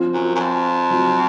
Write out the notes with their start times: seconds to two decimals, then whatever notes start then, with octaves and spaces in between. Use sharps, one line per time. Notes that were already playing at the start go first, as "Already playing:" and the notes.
Already playing: F3 C4 F4
0.14 F#2
0.35 F#2
0.40 F2
0.90 F#3 C4 F4